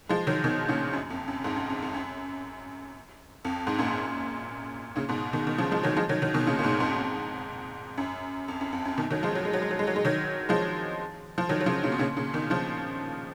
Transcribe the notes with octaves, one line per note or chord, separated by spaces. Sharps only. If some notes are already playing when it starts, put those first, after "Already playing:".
F3 G#3
D#3 F#3
B2 D#3
A#2 C#3
F#2
F2
F#2
F2 G#2
F#2
F#2
F2
F#2
F2
G#2
F#2 A#2
A#2 C#3
G#2 B2
B2 D#3
B2 D#3
C#3 F3
F3 G#3
D#3 F#3
F3 G#3
D#3 F#3
D#3 F#3
B2 D#3
A#2 C#3
A#2
G#2 B2
F2 G#2
F#2
F2
F#2
F2
F#2
B2 D#3
D#3 F#3
F3 G#3
F#3
G#3
F#3
G#3
F#3
G#3
F#3
G#3
D#3 F#3
F3 G#3
F3
D#3 F#3
F#3
C#3 F3
A#2 C#3
B2
A#2 C#3
A#2 C#3
B2 D#3
C#3 F3